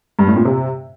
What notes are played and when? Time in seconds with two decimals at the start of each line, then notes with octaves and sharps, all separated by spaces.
0.19 G2
0.27 A2
0.36 A#2
0.45 C3